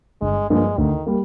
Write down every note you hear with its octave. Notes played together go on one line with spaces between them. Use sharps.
G1 G#3
G2 F3 G#3 A#3
D2 D#3
G3 A#3